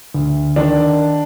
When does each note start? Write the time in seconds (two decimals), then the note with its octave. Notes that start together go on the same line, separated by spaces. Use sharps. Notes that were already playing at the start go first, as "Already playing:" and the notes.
0.14 D2
0.56 D#3 D4